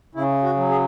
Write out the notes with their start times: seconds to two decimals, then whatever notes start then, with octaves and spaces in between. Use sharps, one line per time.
0.15 C#3 E4
0.43 F#4
0.56 F#3
0.69 G#4